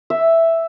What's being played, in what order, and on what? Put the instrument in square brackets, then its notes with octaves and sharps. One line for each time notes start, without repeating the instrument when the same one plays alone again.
[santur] E5